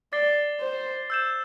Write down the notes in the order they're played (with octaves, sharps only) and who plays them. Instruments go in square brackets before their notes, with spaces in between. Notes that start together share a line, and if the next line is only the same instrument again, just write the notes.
[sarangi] D5 [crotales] D6 A6 C7 G7
[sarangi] C5
[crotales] E6 G6 E7